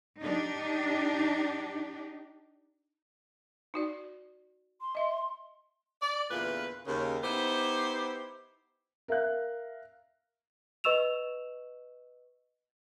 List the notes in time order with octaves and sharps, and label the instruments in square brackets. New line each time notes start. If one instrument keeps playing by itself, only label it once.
[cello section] D4 D#4 G4
[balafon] D#4 F#4 D5
[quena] C6
[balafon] D#5 E5
[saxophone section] D5
E2 A#2 D3 A3 F4 B4
D#2 C#3
B3 D#4 E4 G4 C5
[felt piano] A#4 E5 F5 F#6
[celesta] B4 D#5 C#6 E6 E7 F7